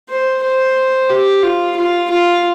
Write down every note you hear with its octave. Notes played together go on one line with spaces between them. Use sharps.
C5
C5
G4
F4
F4
F4